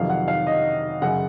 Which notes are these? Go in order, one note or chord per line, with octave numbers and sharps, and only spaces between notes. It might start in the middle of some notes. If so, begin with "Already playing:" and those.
Already playing: F2 C3 D#3 F#3 F5
F#5
F5
D#5
F#2 C#3 F#5